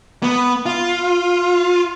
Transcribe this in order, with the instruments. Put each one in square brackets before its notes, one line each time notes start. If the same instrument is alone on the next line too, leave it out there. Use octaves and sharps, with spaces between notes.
[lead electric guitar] B3
F4